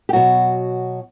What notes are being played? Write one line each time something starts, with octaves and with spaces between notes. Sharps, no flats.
G4
B2 F#3 F#4